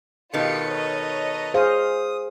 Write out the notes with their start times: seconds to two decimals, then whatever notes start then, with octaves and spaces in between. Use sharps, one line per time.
0.34 B2 D#3 F4 G4 A4 B4 C#7
0.71 C#5 D#5 A#5
1.54 G#4 C5 F5 D#6